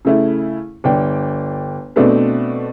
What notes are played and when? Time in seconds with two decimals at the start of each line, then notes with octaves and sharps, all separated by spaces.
0.05 C#3 A3 E4
0.84 G1 D4 G5
1.96 B2 A3 C4 D4 B4